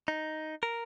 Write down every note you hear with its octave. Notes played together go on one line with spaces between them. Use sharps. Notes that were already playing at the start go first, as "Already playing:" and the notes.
D#4
A#4